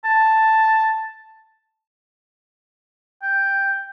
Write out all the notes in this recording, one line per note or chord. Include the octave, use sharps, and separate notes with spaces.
A5
G5